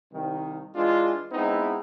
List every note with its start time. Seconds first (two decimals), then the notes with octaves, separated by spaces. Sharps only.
0.12 C2 D#3
0.75 E3 G#3 D4 F4
1.32 G#3 B3 C4 D#4 E4